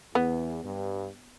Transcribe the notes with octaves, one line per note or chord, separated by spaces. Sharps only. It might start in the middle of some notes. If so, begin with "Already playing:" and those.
E2 B3
G2